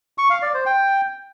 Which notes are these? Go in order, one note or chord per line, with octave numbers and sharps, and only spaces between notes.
C#6
F5
D5
C5
G5